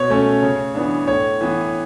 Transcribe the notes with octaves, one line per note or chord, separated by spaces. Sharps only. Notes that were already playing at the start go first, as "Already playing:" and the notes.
Already playing: B2 C#5
A3 C#4
C#3
E3 B3 D4
A2 C#5
E3 B3